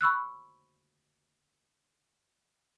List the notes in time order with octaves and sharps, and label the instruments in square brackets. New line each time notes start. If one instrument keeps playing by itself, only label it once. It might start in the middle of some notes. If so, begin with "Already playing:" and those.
[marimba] B5 C#6 E6 F#6